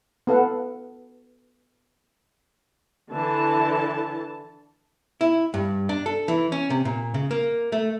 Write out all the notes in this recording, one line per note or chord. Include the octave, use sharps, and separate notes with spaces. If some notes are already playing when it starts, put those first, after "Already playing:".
B3 A4 F5 F#5
D3 E3 A5
E4
G2
D4
A4
E3
C#4
C3
A#2
C#3
A#3
A3